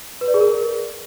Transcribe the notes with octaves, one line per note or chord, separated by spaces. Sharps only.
B4
D5
G#4
A#4